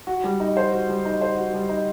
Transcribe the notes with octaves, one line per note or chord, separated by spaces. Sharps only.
F#4
G3
D#4
C5
F#4
G3
D#4
C5
F#4
G3
D#4